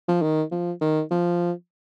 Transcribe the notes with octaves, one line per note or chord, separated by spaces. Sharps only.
F3
D#3
F3
D#3
F3